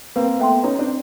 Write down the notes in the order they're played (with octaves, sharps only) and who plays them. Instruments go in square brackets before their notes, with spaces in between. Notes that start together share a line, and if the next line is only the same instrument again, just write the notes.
[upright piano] A#3 C4 [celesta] B4
[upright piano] A3 B3 [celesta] E5 G5 C6
[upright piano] C#4 D#4 [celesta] B4
[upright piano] C4 D4